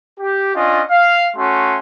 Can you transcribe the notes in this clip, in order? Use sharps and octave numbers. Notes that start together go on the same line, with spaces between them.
G4
C#4 D4 F4 D#5
F5
A3 C#4 F#4 C6